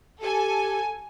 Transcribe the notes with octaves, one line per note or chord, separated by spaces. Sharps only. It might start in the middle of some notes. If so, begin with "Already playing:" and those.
G4 A4 G#5